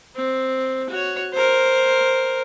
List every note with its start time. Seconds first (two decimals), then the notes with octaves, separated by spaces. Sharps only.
0.16 C4
0.89 F#4 C#5
1.33 A#4 C5